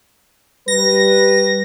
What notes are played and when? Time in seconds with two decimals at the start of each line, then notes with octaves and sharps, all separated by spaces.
0.68 G3 B4 A#6